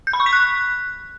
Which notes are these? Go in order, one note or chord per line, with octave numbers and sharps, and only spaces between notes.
G6
B5
C#6
B6
F#6